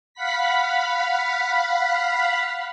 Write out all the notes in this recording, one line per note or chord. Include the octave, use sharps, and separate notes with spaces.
F5 F#5 B5 B6